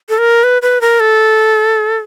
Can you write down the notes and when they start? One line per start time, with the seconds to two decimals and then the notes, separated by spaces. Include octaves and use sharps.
0.09 A4
0.18 A#4
0.43 B4
0.62 B4
0.81 A#4
1.00 A4